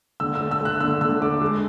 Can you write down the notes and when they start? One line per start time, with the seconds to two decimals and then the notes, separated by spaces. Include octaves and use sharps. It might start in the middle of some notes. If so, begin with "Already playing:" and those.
0.20 D3 E6
0.35 E6
0.41 A3
0.51 E6
0.61 A3 F#6
0.80 D3 E6
1.01 D3 E6
1.21 A3 D6
1.41 G#3